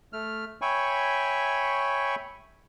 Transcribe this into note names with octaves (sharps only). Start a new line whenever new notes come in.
A3 F6
C#5 E5 G5 G#5 B5 C#6